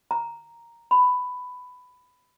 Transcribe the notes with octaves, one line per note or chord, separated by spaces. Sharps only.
A#5
B5